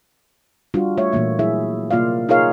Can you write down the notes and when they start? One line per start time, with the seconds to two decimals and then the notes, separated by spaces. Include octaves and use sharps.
0.74 G3 D4 F4 F#4
0.97 A3 C#5 E5
1.12 A#2 E3 A3 A#3 E5
1.39 F#3 E4 G#4 E5
1.91 C3 A#3 F4 D5 F5
2.29 D#4 F4 G#4 A#4 C#5 F5